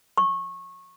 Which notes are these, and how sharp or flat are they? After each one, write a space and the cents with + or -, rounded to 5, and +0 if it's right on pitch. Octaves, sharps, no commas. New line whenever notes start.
C#6 -20